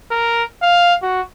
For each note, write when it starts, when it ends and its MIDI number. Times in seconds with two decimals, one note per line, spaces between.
0.11 0.44 70
0.62 0.94 77
1.02 1.21 66